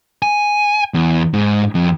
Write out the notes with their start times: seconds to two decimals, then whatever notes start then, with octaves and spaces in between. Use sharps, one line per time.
0.22 G#5
0.94 E2
1.33 G#2
1.75 F2